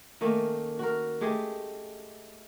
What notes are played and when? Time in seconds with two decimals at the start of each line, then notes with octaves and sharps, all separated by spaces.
0.21 D#3 A3 A#3 C#4
0.79 F#4 A#4
1.21 G#3 A3 G4 G#4